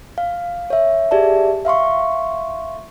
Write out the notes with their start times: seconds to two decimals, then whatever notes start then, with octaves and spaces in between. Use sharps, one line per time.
0.18 F5
0.70 C#5 E5
1.11 G4 G#4 D5 E5 A5
1.65 E5 F5 C6 C#6